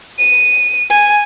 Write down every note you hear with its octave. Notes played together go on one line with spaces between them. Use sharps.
D#7
G#5